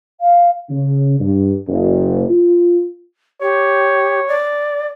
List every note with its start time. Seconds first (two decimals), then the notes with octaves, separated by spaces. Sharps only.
0.21 F5
0.70 C#3
1.20 G2
1.68 F#1
2.29 F4
3.41 G4 C#5
4.28 D5